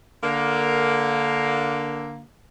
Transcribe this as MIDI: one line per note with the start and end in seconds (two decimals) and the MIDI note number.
0.23 2.23 50
0.23 2.23 58